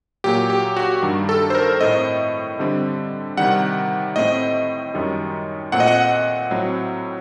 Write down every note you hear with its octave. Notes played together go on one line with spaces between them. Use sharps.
A#2 F#3 A#3 G4
G4
F#4
G2 D#3 G3
A4
C5
A#4
A2 A3 C4 D#5
D3 G3 C4
C3 D#3 G3 F#5
A2 A3 C4 D#5
F#2 D#3 G3
A#2 A3 C4 F#5
D#5
F#5
A2 F#3 C4